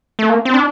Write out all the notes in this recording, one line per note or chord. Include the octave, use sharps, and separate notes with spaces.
A3
A#3
C4
D4